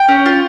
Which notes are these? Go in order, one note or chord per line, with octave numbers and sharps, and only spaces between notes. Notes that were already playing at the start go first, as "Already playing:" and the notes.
Already playing: G5
C#4
F4